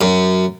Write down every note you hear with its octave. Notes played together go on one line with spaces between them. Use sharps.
F#2